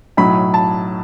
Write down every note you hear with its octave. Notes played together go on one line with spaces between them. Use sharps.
B1 A2 F#3 B5
A5